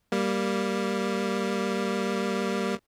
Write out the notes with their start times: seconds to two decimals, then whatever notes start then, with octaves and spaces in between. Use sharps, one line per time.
0.12 G3 A#3